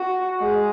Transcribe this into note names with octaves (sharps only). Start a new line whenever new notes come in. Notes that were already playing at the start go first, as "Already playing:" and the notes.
Already playing: F#4
G#3